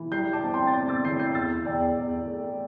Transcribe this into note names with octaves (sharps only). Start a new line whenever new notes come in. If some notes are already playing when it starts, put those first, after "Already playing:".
Already playing: E3
G3 G6 C7
A5 D6
C4
G5 C6
A6
C4 D6 G6
E6 A6
E3 G6 C7
G6 C7
E2 E6 A6
E2 D5 G5
E2 D5
A3